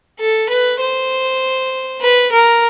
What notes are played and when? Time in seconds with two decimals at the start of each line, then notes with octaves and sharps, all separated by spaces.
0.20 A4
0.49 B4
0.81 C5
2.01 B4
2.32 A#4